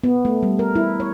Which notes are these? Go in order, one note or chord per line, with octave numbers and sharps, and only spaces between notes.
B3
A3
G3
A#4
E4
C#5